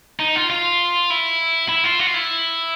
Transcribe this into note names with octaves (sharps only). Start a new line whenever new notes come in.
D#4
F4
F4
E4
E4
F4
F#4
F4
E4